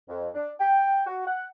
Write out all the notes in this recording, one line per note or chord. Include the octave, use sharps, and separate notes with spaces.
F2
D4
G5
F#4
F#5